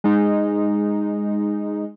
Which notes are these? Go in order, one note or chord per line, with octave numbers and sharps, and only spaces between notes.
G#3 D#4